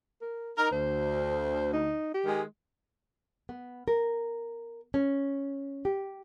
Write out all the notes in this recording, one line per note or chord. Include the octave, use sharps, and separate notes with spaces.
A#4
D#4 A#4
D2 C5
D#4
G4
D#3 G#3
B3
A#4
C#4
G4